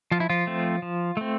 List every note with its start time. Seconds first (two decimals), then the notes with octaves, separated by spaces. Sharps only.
0.11 F3 F4
0.20 E4
0.30 F3 F4
0.47 A3 C4
0.82 F3
1.17 A3 C4